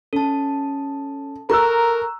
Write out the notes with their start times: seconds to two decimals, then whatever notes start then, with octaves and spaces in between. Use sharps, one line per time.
0.13 C#4 A4 A5
1.50 A4 A#4 A#5 C#6 E6 F#6